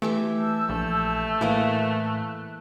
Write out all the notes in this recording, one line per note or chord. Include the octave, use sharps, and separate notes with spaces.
E3 A3 G4 E5
A5 E6 G6
A#1 A3
A2 E3 A#3 D#5 F#6